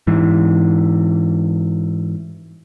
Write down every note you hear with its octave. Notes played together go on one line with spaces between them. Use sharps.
G#2 E3